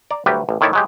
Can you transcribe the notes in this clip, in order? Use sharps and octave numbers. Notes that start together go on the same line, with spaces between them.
D5 A#5
D2 F#3 G3 G4 B4
A1
A2 D#3 E4 C#5 D5 E5
F#3 G#3 G4